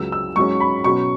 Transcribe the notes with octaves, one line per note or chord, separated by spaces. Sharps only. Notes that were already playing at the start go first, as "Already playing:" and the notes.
Already playing: C#2 C#3 F#3 E6
E6
G#2 F#3 C#4 C#6
B5
B2 F#3 C#4 C#6